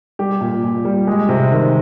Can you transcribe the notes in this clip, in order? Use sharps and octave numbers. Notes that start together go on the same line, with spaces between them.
G3 G4
A#2
A#2
G3
G#3
C3
D#3